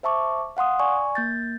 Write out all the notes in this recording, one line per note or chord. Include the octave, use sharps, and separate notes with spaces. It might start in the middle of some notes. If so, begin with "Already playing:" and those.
C5 E5 A5 C#6 D6
F5 F#5 C6 D#6
D5 G#5 C#6
A#3 G6 A6